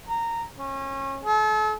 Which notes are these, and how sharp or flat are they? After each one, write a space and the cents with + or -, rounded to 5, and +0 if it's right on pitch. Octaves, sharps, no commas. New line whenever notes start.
A#5 -15
C#4 -30
A4 -40